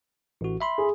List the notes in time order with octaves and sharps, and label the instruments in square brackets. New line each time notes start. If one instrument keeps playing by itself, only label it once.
[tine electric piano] A1 F#4
E5 B5 C6
[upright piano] G#4